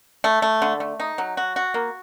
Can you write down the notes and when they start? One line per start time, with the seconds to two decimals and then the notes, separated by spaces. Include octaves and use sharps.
0.24 A3
0.42 A3
0.62 D3
0.80 A3
1.00 D#4
1.18 F#3
1.37 F#4
1.56 F#4
1.74 A#3